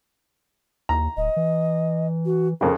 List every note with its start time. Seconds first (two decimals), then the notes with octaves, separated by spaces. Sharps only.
0.89 D#2 A#5
1.17 D1 D#5
1.36 E3
2.25 F#4
2.61 F2 C#3 A#4